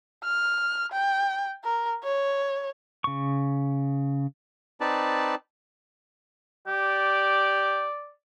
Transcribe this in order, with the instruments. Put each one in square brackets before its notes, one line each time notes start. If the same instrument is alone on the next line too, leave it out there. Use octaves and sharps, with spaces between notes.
[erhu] F6
G5
A#4
C#5
[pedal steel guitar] C#3 C#6
[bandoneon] C4 D#4 B4 D5 A5
[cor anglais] G4 [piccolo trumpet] D5